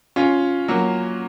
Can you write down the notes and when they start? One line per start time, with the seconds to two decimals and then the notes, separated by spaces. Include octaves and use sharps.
0.16 C#4 F4
0.68 F#3 A#3